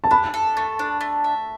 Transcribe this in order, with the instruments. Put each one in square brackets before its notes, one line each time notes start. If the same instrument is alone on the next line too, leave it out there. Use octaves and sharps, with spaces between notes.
[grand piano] A5
[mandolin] D4 [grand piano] B5
[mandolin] A4
A3
D4
A3
E5